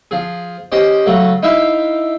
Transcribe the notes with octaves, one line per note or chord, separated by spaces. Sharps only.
F3 G#4
C#4 G4 C5 D#5
C#3 F#3 A3
D#4 E4 E5 F5 G5